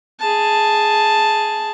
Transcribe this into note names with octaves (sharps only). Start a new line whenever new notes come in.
G#4 A5